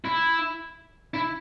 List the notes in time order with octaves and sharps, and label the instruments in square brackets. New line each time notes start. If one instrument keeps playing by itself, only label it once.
[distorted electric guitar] E4
E4